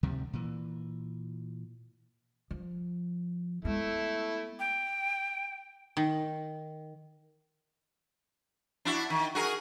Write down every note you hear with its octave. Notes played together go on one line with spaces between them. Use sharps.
D2 C3 D#3 G3
A#2 E3
F3
G#3 A3 B3 E4
G5
D#3
D4 E4 F#4
D#3
F#4 G#4 A#4